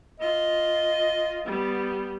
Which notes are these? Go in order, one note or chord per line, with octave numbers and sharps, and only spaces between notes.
F4 D#5
G3 B3